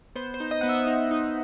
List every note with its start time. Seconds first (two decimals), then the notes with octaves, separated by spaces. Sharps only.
0.15 B3 C5
0.34 C5
0.40 D#4
0.51 D#5
0.61 B3 F#5
0.69 E5
0.87 D#4
1.11 D#4